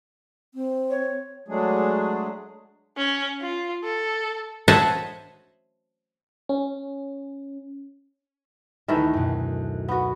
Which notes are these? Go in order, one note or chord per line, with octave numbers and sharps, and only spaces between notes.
C4
C#5
F#3 G#3 A3 D4 G#4
C#4
F4
A4
C5 C#5 D#5 E5 F#5 A5
C#4
D2 D#3 E3 A3 D7
F#2 B2
B3 F#4